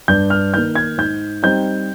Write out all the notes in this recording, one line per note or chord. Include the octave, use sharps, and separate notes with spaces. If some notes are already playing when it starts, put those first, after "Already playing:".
G2 G6
F6
D#3 A#3 G6
G#6
G#2 G6
G3 C4 D#4 G6